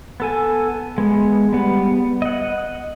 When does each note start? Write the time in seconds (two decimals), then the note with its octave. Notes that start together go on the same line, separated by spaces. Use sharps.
0.20 B3 A4 G#5
0.98 G#3 B3
1.53 G3 B3
2.22 D#5 F#5